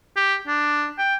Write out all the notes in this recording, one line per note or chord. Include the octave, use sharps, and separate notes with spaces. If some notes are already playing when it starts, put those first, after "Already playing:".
G4
D4
G5